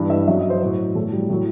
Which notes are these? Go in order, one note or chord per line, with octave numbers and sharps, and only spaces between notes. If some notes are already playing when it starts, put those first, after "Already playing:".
Already playing: G2 E3
E5
F#2 F#3 E5
D#5
C5
A2 F#3 F#4
A2 F#3 A3
G3
A2 F#3 A3